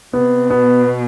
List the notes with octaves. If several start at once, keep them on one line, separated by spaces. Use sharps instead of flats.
C3 B3
B2 B3